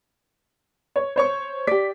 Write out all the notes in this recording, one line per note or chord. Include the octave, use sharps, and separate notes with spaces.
C#5
C5 C#5 C#6
G4 D5 B6